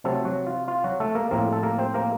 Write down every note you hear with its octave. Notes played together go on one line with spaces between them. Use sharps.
C3 F#3 A3 C4 A4
F#3 F#4
F4
F4
F#3 F#4
A3 A4
A#3 A#4
A2 F3 A#3 C4 A#4
A4
A#3 A#4
C4 C5
A#3 A#4